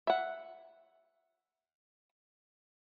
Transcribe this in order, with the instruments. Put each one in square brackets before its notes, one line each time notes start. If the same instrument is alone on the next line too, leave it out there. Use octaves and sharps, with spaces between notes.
[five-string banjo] E5 F#5